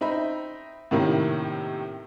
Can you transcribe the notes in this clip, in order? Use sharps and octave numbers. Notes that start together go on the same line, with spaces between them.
C4 D#4 E5 B5
A2 C3 D#3 A#3 C#4 E4